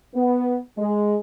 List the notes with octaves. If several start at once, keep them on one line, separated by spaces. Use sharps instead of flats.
B3
G#3